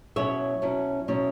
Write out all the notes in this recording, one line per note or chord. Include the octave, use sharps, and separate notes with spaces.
B2 F#3 C#4 E4 C#5 E5
B2 F#3 C#4 E4
B2 F#3 C#4 E4